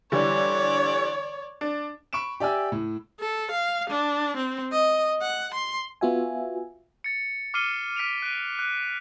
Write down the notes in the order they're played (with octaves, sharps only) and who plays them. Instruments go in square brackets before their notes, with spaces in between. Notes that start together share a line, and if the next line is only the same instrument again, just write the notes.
[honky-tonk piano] D3 E3 G3 [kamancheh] C#5 D5
[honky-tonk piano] D4
[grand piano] B5 C#6 D7 E7
G4 D5 E5 G5 G#5 E6
A2
[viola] A4
F5
D4
C4
D#5
F#5
C6
[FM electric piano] B3 F4 F#4 E5 G#5
[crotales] A6 C#7
D6 F6 C7 C#7 D#7 G7
F6 B6 D7 D#7 F7
F#6 D7 D#7
F#6